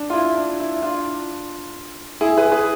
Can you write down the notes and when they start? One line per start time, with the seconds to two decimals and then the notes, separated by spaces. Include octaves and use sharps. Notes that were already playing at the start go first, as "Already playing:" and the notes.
Already playing: D4
0.10 F4
0.13 E4
0.37 D4
0.60 E4
0.82 D4 F4
2.21 E4 G#4
2.37 G#4 B4
2.52 G#4 B4